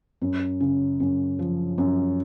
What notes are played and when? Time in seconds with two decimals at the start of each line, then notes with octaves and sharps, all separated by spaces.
0.22 F#2
0.60 C#3
1.00 F#2
1.39 F3
1.78 F#2